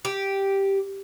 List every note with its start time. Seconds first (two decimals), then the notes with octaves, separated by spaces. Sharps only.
0.05 G4